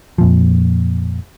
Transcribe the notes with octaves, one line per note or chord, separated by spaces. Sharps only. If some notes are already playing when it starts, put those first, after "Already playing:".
F2 A#2 F3